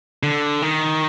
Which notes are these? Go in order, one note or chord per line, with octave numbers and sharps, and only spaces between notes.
D3
D#3